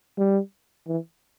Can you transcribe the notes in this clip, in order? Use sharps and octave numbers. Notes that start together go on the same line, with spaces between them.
G3
E3